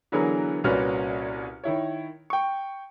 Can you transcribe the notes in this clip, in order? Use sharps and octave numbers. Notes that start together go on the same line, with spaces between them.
D3 E3 F#3 B3 G#4 A#4
C2 A#2 C#4 F#4 B4 F6
D#3 E4 C#5
G5 C#6